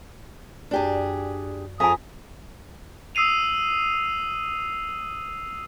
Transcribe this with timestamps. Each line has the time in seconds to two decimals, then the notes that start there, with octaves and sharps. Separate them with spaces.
0.71 F#2 D4 G4 G#4 D5
1.80 F2 G#4 F5 G#5 A#5 D#6
3.15 D#6 E6 C7 D#7 F7